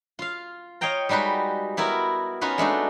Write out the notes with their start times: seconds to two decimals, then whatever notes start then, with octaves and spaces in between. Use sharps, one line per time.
0.19 F4 F5
0.81 C#5 D#5 F5 G5 A#5
1.09 G3 G#3 D#4 F#4 B4
1.77 B3 E4 F#4 A#4
2.41 C#4 D#4 F4 F#4 B4
2.58 G#3 A3 D4 D#4